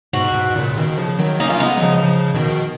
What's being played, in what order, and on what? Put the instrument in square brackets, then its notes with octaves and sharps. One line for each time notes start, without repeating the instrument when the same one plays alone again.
[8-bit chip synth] G#2 B2 [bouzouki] F#4
[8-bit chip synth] G#2 B2
A#2 C#3
B2 D#3
C#3 F3
D#3 F#3
[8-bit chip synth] A#3 C#4 [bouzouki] D#4
[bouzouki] F4
[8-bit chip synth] C#4
[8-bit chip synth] G#3 B3 [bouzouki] D#4
[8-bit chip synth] F#3
C#3 F3
C#3 F3
B2 D#3